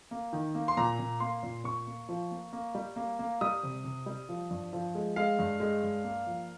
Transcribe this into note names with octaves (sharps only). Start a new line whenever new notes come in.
A#3
D#3
A#3
C6
A#2 A#5
A#2
A#3 C6
A#2
A#2 C#6
A#3
F3
A#3
A#3
G3
A#3
A#3
G3 D#6
C3
C3
G3
F3
G2
F3
G#3
G#3 F5
G2
G#3
G2
A#3
F3